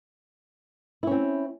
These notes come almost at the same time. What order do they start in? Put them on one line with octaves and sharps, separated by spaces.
E4 C#4 C4